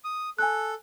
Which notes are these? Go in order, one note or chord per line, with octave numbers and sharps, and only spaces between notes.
D#6
A4 G#5 F#6